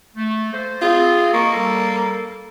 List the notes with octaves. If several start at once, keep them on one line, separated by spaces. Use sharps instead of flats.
A3
A#3 A4 C5
C4 F4 G#4
A#3 D#5 C6 C#6
G3 A4